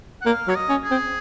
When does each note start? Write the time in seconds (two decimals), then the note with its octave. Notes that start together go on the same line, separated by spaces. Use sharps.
0.22 F#5
0.26 A#3 F5
0.48 F#3 C#5
0.55 D#5
0.69 C#4
0.84 G#4
0.91 C4